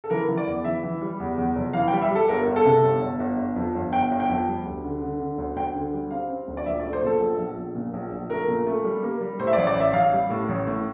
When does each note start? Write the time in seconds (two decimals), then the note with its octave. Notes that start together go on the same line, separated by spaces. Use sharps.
0.04 A4
0.10 E3 A#4
0.28 E3
0.37 D5
0.47 E2
0.64 E3 E5
0.83 E3
1.01 G3
1.20 E2
1.38 E2
1.55 F1
1.73 E3 F5
1.88 G5
1.92 G3
2.01 E5
2.11 G3 A4
2.28 G1 A#4
2.47 G1
2.56 A4
2.65 C3
2.83 G1
3.02 G1
3.20 G1
3.38 G1
3.56 F2
3.74 G1
3.93 G1 G5
4.11 G1
4.20 G5
4.29 F2
4.47 G3
4.65 D2
4.84 D3
5.02 D3
5.20 D3
5.38 D2
5.57 D2 G5
5.74 D3
5.93 G3
6.11 C4 F5
6.29 C4
6.48 D2
6.57 D5
6.66 A#1 E5
6.80 D5
6.84 A3
6.93 C5
7.02 A#2 A4
7.20 A#1
7.38 A#1
7.57 A#1
7.75 A#2
7.93 A#1
8.12 A#1
8.30 A3 A#4
8.48 A#2
8.67 A3
8.85 G3
9.03 A#3
9.21 G3
9.39 A2 C5
9.47 E5
9.53 D5
9.58 A1
9.67 D5
9.76 A1 E5
9.93 A1 F5
10.12 G3
10.30 A2
10.49 A1
10.67 A2